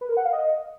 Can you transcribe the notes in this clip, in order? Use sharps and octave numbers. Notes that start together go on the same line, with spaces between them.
B4
A#4
F#5
F5
D#5